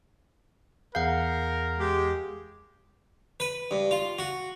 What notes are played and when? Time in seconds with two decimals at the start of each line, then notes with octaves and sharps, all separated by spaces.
0.95 E2 G#4 A#4 F5 F#5 G6
1.79 G#3 G4
3.40 B4
3.71 G2
3.91 F4
4.19 F#4